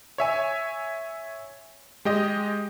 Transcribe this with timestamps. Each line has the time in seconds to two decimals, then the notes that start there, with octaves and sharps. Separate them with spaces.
0.18 C#5 E5 G#5
2.05 G#3 G4 D#5